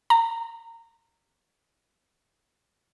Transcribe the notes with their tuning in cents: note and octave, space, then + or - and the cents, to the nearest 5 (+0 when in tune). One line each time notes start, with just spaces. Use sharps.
A#5 -25